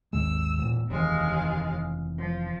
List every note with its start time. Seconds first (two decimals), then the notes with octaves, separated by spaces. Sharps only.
0.13 G#1 D#2 G#3 E6
0.59 E1 A#2
0.89 F1 D#2 E3 G#3 F5
2.18 F3